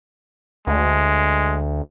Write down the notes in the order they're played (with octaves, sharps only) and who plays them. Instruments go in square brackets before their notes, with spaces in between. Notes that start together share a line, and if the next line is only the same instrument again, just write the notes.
[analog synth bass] D2 [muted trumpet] G#3